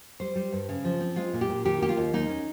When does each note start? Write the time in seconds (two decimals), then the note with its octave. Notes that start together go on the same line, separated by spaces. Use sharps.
0.20 G3 C5
0.36 G3
0.52 G2
0.69 C#3
0.84 F3
1.00 C4
1.16 G#3 F4
1.33 A#2
1.41 G4
1.49 A#2
1.65 D#3 G4
1.81 A#3 G4
1.89 F4
1.97 D#2
2.13 A#3 D#4
2.29 C#4